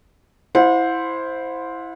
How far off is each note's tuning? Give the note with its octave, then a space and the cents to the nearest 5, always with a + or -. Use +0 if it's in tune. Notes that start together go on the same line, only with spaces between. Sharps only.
E4 +0 C5 +0 F#5 -40